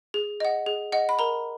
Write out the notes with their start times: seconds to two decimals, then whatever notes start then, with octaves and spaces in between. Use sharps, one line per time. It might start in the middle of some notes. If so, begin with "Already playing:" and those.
0.14 G#4
0.40 D#5 F#5
0.66 G#4
0.92 D#5 F#5
1.09 B5
1.19 A#4 A#5